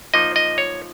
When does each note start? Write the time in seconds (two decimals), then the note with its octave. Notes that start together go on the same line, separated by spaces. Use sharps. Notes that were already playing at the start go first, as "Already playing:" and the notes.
0.14 F3 A#3 D#4 D#5
0.36 D#5
0.58 C#5